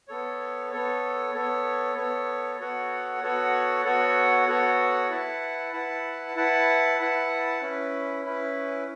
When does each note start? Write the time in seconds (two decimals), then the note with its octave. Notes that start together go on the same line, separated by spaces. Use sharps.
0.08 B3 A4 C#5
0.71 B3 A4 C#5
1.34 B3 A4 C#5
1.96 B3 A4 C#5
2.60 B3 F#4 A4 C#5 F#5
3.21 B3 F#4 A4 C#5 F#5
3.85 B3 F#4 A4 C#5 F#5
4.48 B3 F#4 A4 C#5 F#5
5.10 E4 B4 F#5 A5
5.73 E4 B4 F#5 A5
6.35 E4 B4 F#5 A5
6.99 E4 B4 F#5 A5
7.61 C#4 E4 B4
8.24 C#4 E4 B4